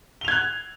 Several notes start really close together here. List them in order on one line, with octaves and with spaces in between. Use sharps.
G7 F7 G#6 F#6